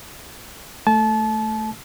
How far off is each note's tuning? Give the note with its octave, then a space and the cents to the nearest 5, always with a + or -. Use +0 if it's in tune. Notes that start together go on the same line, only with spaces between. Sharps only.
A3 +0 A5 -30